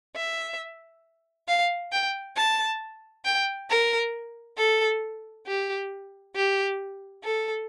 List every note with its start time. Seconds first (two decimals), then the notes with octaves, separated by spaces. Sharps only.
0.16 E5
1.48 F5
1.92 G5
2.36 A5
3.25 G5
3.70 A#4
4.57 A4
5.47 G4
6.35 G4
7.24 A4